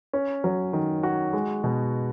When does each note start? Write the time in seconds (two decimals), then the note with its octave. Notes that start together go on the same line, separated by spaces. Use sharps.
0.13 C#4
0.44 F#3
0.73 D#3
1.03 F#4
1.33 G#3
1.64 B2